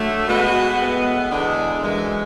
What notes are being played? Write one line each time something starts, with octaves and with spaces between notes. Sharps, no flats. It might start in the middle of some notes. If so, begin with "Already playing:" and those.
Already playing: D3 F#3 A3
B2 G#3 B3 F#4 B4
A2 G#3 B3
E2 D3 G#3 D4
F#2 E3 G#3